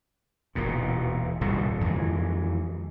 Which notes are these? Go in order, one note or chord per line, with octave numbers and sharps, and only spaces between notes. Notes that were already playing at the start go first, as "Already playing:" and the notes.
E1 D#2 A#2
D#1 C2 G#2 B2
F2 D#3 E3 G#3